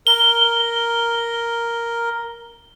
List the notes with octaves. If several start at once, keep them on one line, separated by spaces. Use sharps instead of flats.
A#4 G7